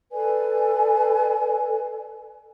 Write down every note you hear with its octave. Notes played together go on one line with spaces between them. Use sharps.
A4 B4 D5 G#5